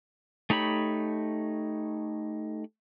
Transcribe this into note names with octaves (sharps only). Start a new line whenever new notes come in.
A3 D#4 G4 C#5 B5